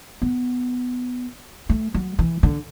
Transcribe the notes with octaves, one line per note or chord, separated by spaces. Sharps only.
B3
A3
F#3
E3
D3